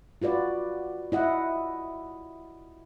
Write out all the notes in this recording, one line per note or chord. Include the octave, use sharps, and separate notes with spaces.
F4 F#4 B4 D5
E4 D#5 F#5